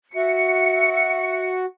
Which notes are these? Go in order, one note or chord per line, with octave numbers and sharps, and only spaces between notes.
F#4 E5 C#7